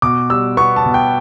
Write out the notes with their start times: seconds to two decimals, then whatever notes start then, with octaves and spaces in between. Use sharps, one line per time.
0.02 B2 D6
0.30 G3 E6
0.57 B3 C#6
0.76 A5
0.85 B2
0.94 G5